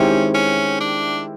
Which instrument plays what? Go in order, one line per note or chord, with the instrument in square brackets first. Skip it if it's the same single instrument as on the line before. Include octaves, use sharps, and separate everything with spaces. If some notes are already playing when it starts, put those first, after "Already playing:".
Already playing: [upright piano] D#3 G#3 C4 E4 G4 [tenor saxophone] C#4
[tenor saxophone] C#4
D4